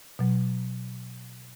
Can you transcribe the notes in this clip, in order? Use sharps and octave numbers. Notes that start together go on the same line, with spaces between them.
B2 F#3